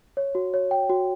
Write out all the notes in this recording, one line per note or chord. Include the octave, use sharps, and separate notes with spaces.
C#5
F#4
C#5
G5
F#4